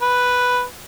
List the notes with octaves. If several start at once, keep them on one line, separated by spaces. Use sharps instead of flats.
B4